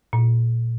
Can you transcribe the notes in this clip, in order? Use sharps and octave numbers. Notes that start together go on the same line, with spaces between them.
A#2